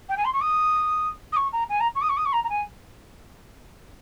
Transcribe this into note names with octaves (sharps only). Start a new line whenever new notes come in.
G5
G#5
C6
C#6
D#6
D#6
C#6
A#5
G#5
A#5
C#6
D#6
C#6
D#6
C#6
A#5
A#5
G#5